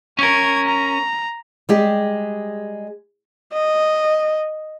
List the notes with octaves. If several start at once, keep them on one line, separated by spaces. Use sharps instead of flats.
C#4 A#4 C#6 G#6
A#5
G3 G#3 G4
D#5